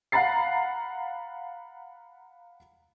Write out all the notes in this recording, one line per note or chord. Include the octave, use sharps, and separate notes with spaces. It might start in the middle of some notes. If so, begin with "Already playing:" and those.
F5 F#5 A#5 B5 A6 C7